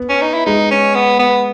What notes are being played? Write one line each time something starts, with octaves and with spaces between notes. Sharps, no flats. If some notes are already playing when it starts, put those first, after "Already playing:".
Already playing: B3
C#4
D#4
E4
G#3 D#4
C#4
B3
B3